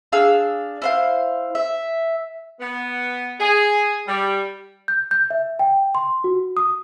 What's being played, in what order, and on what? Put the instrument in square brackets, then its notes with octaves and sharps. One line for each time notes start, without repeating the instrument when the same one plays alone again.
[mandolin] D4 G#4 F5 E6
E4 C5 F5
E5
[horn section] B3
G#4
G3
[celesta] G6
G6
E5
G5
C6
F#4
D#6